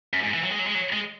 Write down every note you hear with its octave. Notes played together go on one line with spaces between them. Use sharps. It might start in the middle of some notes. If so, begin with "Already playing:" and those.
F#2
G#2
E3
F#3
G#3
F#3
G#3
F#3
G#3